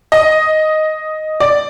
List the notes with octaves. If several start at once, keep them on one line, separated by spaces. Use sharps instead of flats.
D#5
D5